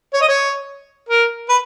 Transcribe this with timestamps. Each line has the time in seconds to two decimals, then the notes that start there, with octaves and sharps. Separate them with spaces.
0.14 C#5
0.21 D#5
0.28 C#5
1.09 A#4
1.49 B4